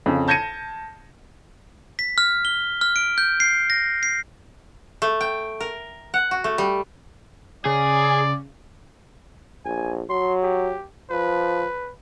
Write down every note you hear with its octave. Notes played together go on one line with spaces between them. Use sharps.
F2 C#3
A5 G6 G#6 A#6 C#7 D#7
B6
F6
G7
F6
D7
G6
C7
A#6
C7
A3
G5
A#4
F#5
F#4
A3
G3
C#3 G#4 D5
A#1 G#5
F#3 C6
G4
F3 B4